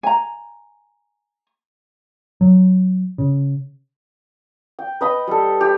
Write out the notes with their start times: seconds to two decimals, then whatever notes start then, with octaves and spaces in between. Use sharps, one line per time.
0.03 G#5 A#5
2.41 F#3
3.18 C#3
4.79 G5
5.01 B4 D#5 B5
5.27 G3 A4
5.61 G4